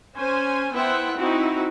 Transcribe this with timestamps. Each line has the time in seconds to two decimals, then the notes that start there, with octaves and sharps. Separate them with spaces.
0.17 C#4 C5 G#5
0.74 B3 E4 C5 E5 F#5 G5
1.17 C4 D#4 E4 F#4